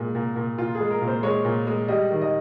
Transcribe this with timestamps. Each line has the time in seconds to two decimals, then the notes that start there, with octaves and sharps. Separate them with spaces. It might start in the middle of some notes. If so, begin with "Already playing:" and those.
Already playing: A#2 G#3
0.15 A#2
0.36 A#2
0.58 A#2 F4
0.75 G#4
0.80 G#3
0.91 A#4
1.01 A#2
1.08 C5
1.23 G#3 C#5
1.45 A#2
1.67 G#3
1.88 G3 D#5
2.11 D#3
2.22 D#5